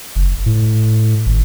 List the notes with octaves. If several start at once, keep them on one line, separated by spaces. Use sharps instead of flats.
F#1
A2
G#1